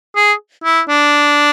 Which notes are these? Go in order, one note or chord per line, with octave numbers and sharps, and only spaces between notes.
G#4
E4
D4